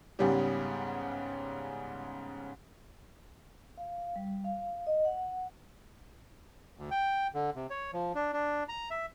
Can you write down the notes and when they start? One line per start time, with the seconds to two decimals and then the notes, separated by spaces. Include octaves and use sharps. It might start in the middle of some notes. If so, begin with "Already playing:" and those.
0.19 G#2 C#3 G3 B3 C#4 G4
3.78 F5
3.98 F5
4.16 G3
4.44 F5
4.87 D#5
5.05 F#5
6.78 D2
6.91 G5
7.34 D3
7.56 C3
7.70 C#5
7.93 F3
8.15 D4
8.33 D4
8.68 A#5
8.90 E5